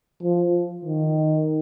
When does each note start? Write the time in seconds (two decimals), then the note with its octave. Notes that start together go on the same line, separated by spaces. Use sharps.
0.23 F3
0.85 D#3